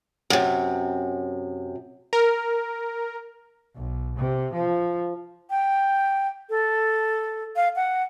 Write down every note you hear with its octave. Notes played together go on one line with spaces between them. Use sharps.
F#2 C3
A#4
B1
C3
F3
G5
A4
F5
F#5